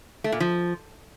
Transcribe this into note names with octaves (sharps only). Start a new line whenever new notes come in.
A3
A#2
F3